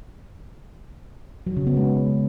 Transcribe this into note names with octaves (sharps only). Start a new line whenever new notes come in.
F#3
C#3
B3
G#3